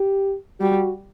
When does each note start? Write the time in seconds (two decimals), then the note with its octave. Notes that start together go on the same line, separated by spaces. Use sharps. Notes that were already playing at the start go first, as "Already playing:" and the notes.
Already playing: G4
0.60 G3 F#4